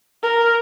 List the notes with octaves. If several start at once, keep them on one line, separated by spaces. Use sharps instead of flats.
A#4